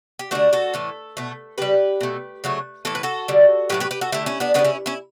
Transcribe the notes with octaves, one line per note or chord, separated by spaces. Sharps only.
G4
D3 A3 D4 F#4
F#4 A4
A2 E3 A3
B2 A3
C#3 G3 G4 B4
B2 A3
C#3 F#3 A3
A2 E3 A3 A4
B4
F#4 A4
D3 G3
A2 F#3 A3 G4 B4
G4 B4
G4 B4
F#4 A4
D3 A3 E4 G4
C#4 E4
B3 D4
C#3 E3 G3 B3 D4
C#4 E4
C#4 E4